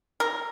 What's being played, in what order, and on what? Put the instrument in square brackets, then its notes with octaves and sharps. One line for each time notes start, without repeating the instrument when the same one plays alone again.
[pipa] A#4